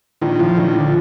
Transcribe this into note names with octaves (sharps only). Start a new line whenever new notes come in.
A#1 D#3
A2 F3
A#1 D#3
D3 F3